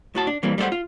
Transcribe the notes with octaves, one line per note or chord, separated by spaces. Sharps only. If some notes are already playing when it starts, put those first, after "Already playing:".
A2 F#4 A5
D4
A#2 E3 G3 A#3 C4
G3 A3 B3 C5 F#5
F4